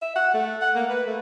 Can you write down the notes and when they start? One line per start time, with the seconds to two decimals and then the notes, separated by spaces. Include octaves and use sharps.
0.02 E5
0.15 F#5
0.34 A3
0.61 F#5
0.75 A#3
0.90 B4
1.06 A3